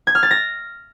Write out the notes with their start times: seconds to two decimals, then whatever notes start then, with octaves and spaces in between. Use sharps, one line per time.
0.07 G#6
0.15 F6
0.23 A6
0.31 A#6